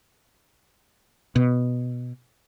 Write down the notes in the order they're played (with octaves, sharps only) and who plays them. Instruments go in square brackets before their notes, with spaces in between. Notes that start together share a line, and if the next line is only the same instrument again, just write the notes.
[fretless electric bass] B2